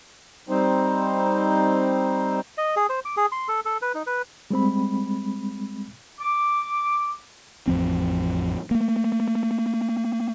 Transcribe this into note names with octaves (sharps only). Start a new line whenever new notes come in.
G3 C4 D#4 C5
D#5
G#4
C5
D6
G#4
C6
A4
A4
B4
D#4
B4
G3 G#3 C4 B5
D6
A1 F2 F3 C4
A3 A#3